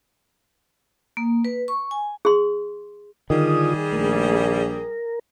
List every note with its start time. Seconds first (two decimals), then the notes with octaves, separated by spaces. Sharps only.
1.17 A#3
1.45 B4
1.68 C#6
1.91 G#5
2.25 G#4 C6
3.30 D3 D#3 G3 F4 G#4 D#6
3.92 A#1 A3 A#4
4.39 A#4